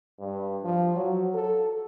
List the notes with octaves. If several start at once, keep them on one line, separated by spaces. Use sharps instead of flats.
G2
F3
F#3
A4